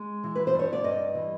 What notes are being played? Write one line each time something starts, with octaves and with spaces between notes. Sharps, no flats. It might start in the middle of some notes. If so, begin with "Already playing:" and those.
Already playing: G#3
E3
B4
C5
G2
C#5
D5
G2 D#5
E3